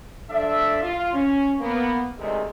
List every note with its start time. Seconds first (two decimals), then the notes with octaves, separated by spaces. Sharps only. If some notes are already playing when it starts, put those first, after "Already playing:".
0.29 F3 D4 A4 E5
0.81 F4
1.13 C#4
1.59 A#3 B3
2.18 D2 C3 D#3 G#3